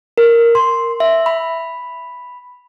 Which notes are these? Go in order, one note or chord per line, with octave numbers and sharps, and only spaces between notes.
A#4
C6
E5
B5